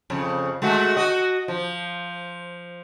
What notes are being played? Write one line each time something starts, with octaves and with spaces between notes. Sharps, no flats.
F2 C#3
G#3 A3 F#4
F#4 D#5
F3